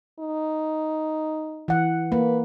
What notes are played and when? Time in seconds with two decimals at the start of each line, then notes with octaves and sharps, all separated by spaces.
0.19 D#4
1.68 E3 F#5
2.12 A#3 B4